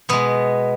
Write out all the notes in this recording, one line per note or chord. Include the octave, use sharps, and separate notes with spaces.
B2 G#3 B3